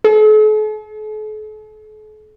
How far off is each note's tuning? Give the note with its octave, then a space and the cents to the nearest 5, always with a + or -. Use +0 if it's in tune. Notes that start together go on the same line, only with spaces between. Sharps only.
A4 -45